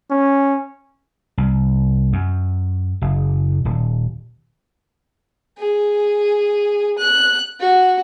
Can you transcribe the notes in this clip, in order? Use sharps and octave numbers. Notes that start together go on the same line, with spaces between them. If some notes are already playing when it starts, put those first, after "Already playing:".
C#4
C2
F#2
F#1
D#1
G#4
F#6
F#4